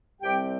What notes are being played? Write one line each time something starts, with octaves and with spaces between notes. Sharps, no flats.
C2 C3 G3 C4 G4 G5